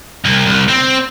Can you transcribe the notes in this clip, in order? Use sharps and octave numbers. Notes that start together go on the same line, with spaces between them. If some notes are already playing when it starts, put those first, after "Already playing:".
C2
C2
C4